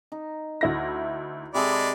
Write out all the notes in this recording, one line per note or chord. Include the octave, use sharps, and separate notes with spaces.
D#4
D2 E4 A#6
C3 G#3 G#4 A4 D5 B5